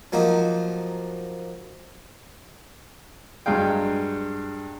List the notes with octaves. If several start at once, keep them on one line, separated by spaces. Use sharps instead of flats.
F3 F#3 A#3 D#4
G2 F#3 G#3 F5 G5